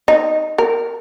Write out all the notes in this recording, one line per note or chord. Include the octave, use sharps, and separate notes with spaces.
D#4
A#4